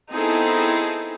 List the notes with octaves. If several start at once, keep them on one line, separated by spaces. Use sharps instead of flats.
B3 C4 D#4 E4 G#4 A4